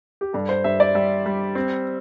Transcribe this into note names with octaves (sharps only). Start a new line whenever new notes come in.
G4
G2 A4
C5
G2 E5
D5
G3 E5
G3
C4